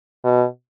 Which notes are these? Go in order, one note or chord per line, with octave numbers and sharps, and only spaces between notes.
B2